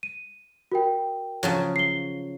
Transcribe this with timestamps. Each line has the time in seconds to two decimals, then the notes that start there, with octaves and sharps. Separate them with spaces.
0.03 D#7
0.72 F#4 A#4 G5
1.43 C#3 F3 F#3
1.76 C7 G7